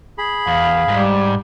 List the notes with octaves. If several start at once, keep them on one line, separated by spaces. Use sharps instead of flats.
G#4 B5
E2 F5
G#2 G3